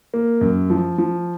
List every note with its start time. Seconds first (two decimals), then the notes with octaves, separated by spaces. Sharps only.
0.14 A#3
0.41 F#2
0.70 F3
0.98 F3